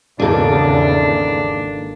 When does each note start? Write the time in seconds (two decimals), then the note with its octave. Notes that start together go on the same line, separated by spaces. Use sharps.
0.20 G#1 E2 C#3 A#3 D4 D#4 G#4 A4